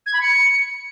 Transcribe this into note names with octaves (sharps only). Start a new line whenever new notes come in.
G#6
B5
C#7